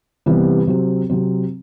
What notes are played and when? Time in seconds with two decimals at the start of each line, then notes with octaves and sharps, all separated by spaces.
0.26 C3 E3 G3 B3
0.67 C3 F#3 C4
1.10 C3 F#3 C4